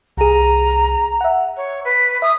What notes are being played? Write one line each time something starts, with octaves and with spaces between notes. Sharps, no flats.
C2 G#4 A#5
E5 F#5
C#5
B4
E5 D#6